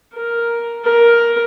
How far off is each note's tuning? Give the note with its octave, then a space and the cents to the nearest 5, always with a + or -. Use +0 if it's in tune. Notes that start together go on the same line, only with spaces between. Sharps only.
A#4 +5
A#4 +10